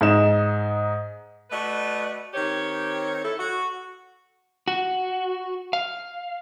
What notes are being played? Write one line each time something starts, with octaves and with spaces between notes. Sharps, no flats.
G#2 D#4 E7
A3 F#4 B4 D5 D#5
D#3 C4 G4 C#5
E4 A4
F#4
F#4
F5